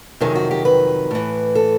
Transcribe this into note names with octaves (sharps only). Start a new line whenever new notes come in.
F2 C3 D#3 F#3 G#4
F#4
G4
B4
A2 E3
A4